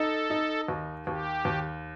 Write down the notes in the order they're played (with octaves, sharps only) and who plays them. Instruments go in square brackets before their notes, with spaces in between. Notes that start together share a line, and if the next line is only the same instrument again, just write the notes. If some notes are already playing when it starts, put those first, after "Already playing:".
Already playing: [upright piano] D#4 [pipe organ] A4
[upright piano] D#4
D#2
[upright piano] D#2 [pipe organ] G4
[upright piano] D#2